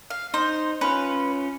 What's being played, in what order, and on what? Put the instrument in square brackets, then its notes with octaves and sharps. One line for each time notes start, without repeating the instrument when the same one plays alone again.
[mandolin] F5
[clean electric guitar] D#4 [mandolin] C5
[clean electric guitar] C#4 F4 [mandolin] B4